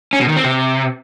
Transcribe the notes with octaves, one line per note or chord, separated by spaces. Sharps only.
C#4
B2
D#3
C4
C3